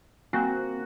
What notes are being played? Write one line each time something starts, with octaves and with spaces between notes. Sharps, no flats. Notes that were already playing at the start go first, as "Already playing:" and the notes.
A#3 C4 F#4 G#5